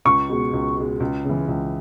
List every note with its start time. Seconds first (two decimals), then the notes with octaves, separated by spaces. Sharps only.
0.05 C#2 C#6
0.29 B2 G#3
0.53 C#2
0.77 B2 G#3
1.00 C#2
1.25 C#3 E3
1.48 C#2